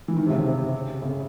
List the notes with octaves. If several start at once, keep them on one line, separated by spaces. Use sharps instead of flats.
E3
D#3
C3
C#3
C3
C#3